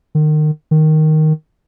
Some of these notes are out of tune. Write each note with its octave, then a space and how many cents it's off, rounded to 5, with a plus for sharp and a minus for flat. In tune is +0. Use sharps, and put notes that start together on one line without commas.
D#3 -30
D#3 +0